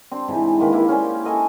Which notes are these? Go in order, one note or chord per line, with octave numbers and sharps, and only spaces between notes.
C4 D4 G4
G#2 C3 E3
D#3 A#3 B4
A#3 E4 G4
C#4 C5 D5 G5
A4 D#5 G5 G#5